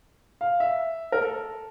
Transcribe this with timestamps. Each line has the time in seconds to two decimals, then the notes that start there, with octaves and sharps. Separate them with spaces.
0.41 F5
0.60 E5
1.12 A#4
1.21 A4